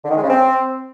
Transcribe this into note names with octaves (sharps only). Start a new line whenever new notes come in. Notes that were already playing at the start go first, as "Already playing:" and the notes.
D3
D#3
G#3
C#3
C4